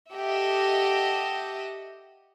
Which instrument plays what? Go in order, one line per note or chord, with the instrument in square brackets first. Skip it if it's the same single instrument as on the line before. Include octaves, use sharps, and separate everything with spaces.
[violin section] G4 A4 D#5 E5 F#5